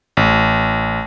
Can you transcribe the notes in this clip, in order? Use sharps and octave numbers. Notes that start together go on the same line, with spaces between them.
A1